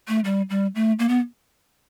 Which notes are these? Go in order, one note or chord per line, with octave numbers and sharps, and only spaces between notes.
A3
G3
G3
A3
A#3
B3